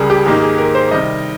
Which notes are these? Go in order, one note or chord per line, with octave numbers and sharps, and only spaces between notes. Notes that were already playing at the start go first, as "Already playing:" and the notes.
Already playing: C#2 C#3 G3 G#4 A#4
G4
G#2 D#3 A#3 D#4 G4
G#4
A#4
C5
C3 D#3 G3 D#5